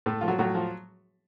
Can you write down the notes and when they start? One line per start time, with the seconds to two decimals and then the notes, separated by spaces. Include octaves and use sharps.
0.06 A2 A3 A4
0.21 F3 F4
0.28 F#3 F#4
0.38 A2 F#3 F#4
0.55 F3